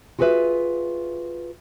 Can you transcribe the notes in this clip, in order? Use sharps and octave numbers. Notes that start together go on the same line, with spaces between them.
F4 F#4 G#4 A#4 B4 E5